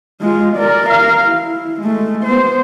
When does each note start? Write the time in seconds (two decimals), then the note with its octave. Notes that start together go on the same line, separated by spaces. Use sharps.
0.21 G#3 F4
0.57 A#4 D5
0.87 A#4 F5
1.25 E4
1.81 G#3 A3
2.24 B3 C5